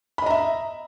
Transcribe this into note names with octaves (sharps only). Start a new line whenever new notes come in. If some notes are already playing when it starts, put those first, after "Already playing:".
D#5 E5 A#5 B5